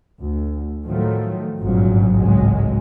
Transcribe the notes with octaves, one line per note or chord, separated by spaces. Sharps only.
D2
A2 D#3 F3 F#3 A3
G#1 G2 A#2 C#3 F3 F#3
G#1 C#2 A2 D#3 F#3 G#3